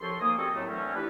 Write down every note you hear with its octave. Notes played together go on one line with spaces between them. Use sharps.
C2 F3 A4 C#5 C6
D#3 A#3 G#5 D#6
G3 C4 F#4 G#4 A4 D#5
F#2 A2 F#3 A3
D3 E3 A3 C4 C#4
D4 E4 G4 B4